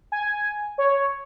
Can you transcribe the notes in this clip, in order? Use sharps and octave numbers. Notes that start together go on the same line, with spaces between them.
G#5
C#5